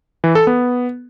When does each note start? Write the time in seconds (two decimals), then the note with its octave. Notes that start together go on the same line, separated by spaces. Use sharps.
0.24 E3
0.35 A4
0.47 B3